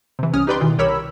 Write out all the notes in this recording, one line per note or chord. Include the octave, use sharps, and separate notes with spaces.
C3 E3
C2 C#4 D#6 F6
D#4 G4 B4 D5 G5 C6
B2 D#3 E3
C2 G4 A#4 C#5 B5 E6